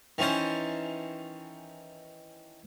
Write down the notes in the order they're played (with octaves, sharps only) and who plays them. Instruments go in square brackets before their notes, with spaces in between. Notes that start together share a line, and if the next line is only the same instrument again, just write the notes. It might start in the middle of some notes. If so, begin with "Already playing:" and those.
[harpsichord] D#3 E3 C#4 C5 A5